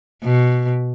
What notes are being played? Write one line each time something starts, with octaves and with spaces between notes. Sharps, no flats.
B2